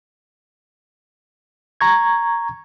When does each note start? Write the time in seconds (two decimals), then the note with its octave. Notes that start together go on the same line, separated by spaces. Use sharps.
1.81 A#5 C#6 G#6